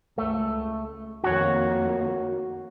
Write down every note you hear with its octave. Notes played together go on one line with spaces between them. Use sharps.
C#2 A3
F2 D#3 A#3 F#4 C#5